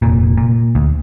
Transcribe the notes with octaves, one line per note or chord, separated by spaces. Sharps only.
F1 A#2
A#2
D2